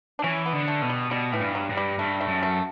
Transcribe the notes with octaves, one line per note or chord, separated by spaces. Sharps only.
D4
E3 C#4
B3
D3
A3
B2
G3
B2 G3
A2 E3
G2
F#3
G2
G3
G2 A3
A3
F#2
A3